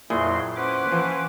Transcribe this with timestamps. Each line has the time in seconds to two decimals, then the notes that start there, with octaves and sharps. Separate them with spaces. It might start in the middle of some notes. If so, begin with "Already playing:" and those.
0.10 F2 A#2 F#3 E4 G#4 C6
0.56 C#4 B4 C5 F#5 D6
0.92 E3 F3